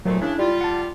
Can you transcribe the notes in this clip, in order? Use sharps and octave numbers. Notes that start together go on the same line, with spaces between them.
D#2 A#2 F#3 A3 A4 C5
C#3 D4 E4
G3 F4
F#5 A5